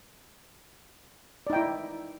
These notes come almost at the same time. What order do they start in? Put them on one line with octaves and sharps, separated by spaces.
D5 D#4 G5 E4